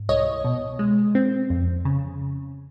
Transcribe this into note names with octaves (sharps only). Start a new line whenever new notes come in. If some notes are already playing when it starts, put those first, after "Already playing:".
Already playing: G#2
C2 C#5 D#5
B2
G#3
C4
F2
C#3